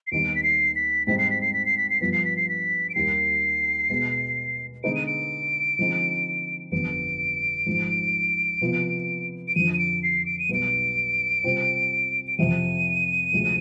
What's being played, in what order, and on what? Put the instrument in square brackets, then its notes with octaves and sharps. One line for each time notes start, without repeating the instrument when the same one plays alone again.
[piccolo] C7
[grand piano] D#2 D#3 G3 B3 D#4 [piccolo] D7
[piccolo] B6
C7
B6
[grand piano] G#2 G3 C4 D#4 [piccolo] B6
[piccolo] C7
B6
C7
B6
C7
B6
C7
[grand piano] G2 F3 B3 [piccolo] B6
[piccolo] C7
B6
C7
B6
D7
[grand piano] D#2 D#3 G3 [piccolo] C7
[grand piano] B2 G#3 B3
[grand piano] D3 G#3 B3 D#4 B4 [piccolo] D7
[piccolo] D#7
D7
[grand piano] D3 F3 G#3 C4 D#4
[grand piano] G1 F2 D3 G3 B3 [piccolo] D7
[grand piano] G#1 G#2 F3
C3 F3 B3 F4
[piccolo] D7
[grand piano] F2 D3 F3 [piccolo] D#7
[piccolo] D#7
D7
C7
D7
D#7
[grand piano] B1 B2 G3 B3 D#4 [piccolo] D7
[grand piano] C3 G3 C4 F4 C5
[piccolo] D7
[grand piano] F2 C3 F3 [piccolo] D#7
[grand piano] D2 C3 F3 G#3 C4